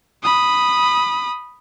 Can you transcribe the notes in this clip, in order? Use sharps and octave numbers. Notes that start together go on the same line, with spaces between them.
B5 D#6